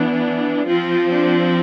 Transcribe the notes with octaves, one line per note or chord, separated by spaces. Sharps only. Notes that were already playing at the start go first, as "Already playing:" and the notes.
Already playing: E3 B3 D4
F3 C4 F4
D4